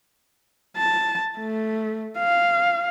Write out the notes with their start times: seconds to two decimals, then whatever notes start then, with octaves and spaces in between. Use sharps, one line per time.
0.77 A5
1.39 A3
2.18 F5